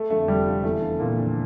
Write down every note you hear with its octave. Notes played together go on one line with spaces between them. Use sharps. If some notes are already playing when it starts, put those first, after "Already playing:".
Already playing: A3
F2 D3 F3 A3
F1 G3
F2 D3 F3
E2 A3
D3 F3
E2 A#2 A#3
D3 F3